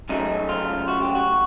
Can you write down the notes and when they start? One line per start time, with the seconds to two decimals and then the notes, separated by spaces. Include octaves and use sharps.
0.09 F#2 C#3 F#3 A3 D#4
0.49 F4
0.88 F#4
1.02 G4
1.15 F#4